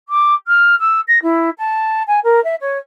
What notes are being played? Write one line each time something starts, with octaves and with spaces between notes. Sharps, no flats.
D6
F6
E6
A#6
E4
A5
G#5
A#4
E5
C#5